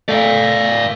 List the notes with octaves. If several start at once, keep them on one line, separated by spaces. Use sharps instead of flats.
A3 D5 F5